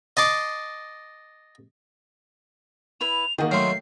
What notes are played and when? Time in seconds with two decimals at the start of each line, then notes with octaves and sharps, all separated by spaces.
0.17 D#5 A5 C6 D6
3.01 E4 B4 B5 F7
3.38 D#3 A#3 F#4 G#4
3.51 F#3 A3 F5 C6 C7